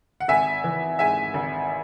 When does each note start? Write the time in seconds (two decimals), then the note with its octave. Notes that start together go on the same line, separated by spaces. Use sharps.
0.20 F#5
0.28 G#1 E5 G#5
0.64 E3
0.99 G#2 E5 G#5
1.34 G#1